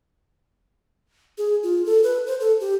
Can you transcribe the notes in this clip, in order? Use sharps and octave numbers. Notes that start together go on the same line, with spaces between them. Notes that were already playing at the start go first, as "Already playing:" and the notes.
G#4
F4
A4
B4
C5
A4
G4